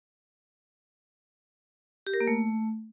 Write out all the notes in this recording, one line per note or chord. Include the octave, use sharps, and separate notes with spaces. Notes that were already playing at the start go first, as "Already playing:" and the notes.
G4
A#4
A#3
A3